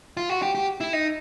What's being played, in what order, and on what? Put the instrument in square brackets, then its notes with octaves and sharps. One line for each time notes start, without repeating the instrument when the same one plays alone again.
[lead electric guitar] F4
F#4
G4
G4
E4
D#4